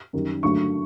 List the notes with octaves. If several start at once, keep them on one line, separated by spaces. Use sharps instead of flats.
F#2 D#3 G3
G2 D3 F#3 A3 C#6